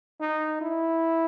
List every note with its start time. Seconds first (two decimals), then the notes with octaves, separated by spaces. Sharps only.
0.20 D#4
0.61 E4